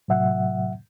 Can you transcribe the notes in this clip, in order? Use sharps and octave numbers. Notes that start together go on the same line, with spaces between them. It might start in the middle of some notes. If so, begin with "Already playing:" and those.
A2 C3 F#3 E5 F#5